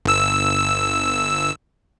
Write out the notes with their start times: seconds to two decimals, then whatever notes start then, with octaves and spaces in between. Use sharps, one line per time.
0.05 G1 E6